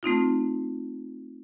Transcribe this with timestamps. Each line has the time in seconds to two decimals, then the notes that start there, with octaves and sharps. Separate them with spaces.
0.03 A3 C4 D#4 F4